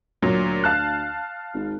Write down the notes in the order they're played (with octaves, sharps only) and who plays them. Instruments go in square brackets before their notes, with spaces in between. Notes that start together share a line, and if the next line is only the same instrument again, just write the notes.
[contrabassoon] D2 [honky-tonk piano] A#2 F#3
[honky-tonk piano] F5 A5 F#6
[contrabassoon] G#1